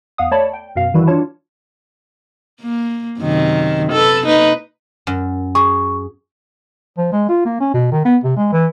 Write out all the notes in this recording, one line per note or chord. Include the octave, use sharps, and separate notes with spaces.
E2 F5 F#5 D#6
A3 C#5 D5 A5 B5
G5
F#2 B2 F5
D#3 E3 G3 E4 F#4
D4 F4 C#5 A5
A#3
F#2 C3 D#3
A4 B4
A#3 D#4 B4
F#2
G#4 C#6
F3
G#3
F4
A#3
C#4
B2
D#3
B3
C3
G#3
E3